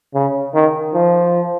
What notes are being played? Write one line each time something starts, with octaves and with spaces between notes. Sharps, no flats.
C#3
D#3
F3